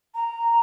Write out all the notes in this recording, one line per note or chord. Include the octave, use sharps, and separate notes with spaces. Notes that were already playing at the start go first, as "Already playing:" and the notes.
A#5